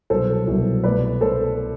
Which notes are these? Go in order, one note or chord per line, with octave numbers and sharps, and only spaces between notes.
C2 B2 F#3 A4 C5
C2 B2 F#3
C2 B2 A3 B4 D5
B2 A3 A4 C5